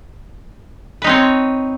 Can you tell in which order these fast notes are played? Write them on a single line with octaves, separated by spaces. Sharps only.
B4 D#4 C4 C#5